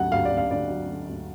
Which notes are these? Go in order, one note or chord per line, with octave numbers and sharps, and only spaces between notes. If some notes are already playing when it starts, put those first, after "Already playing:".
Already playing: D2 F#3 F#5
D2 F5
D5
D2
F5
D2 D5
F#3
D3
D2